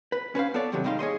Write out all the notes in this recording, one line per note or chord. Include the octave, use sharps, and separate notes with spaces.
B4
C#4 B4 C5 F5
B3 A4 C#5 D5
G2 C3 D#3 F#3
G#2 G3 D#4 F5 C6
G#4 C#5 D#5 C6